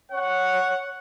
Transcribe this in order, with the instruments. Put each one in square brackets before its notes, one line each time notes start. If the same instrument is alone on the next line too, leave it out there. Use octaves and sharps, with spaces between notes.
[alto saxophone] C#5 [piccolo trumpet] F#5